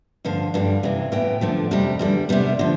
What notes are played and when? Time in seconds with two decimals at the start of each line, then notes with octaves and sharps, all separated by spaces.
0.25 G2 D3 F3 F5
0.54 G2 D3 G3
0.83 D2 C3 E3
1.12 A2 E3 B3 G5
1.41 D2 D3 F3 A3
1.71 F2 C3 G3
1.99 E2 D3 G3
2.29 E2 C3 G3 B3
2.59 D3 F3